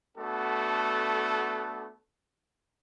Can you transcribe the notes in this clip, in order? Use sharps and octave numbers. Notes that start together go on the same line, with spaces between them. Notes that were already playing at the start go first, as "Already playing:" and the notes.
A3 B3 D4 F#4 A4